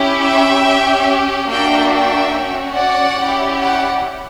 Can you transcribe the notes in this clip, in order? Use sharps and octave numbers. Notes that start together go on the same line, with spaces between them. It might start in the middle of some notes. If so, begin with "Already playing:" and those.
Already playing: C#4 E4 G4
E5 G5
C#4 G4
A#3 D4 F#4 E5 G5
E5 G5
C#4 F#4
D5 F#5
C#4 E4 G4
D5 F#5